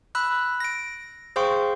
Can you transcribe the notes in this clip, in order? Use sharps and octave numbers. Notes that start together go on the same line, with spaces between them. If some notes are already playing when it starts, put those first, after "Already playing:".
B5 E6 F#6
A#6 D7
G#4 C5 F5 G5 C6 C#6